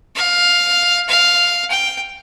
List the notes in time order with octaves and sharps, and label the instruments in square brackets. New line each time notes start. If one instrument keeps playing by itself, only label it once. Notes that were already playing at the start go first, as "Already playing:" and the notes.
[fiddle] F5
F5
G5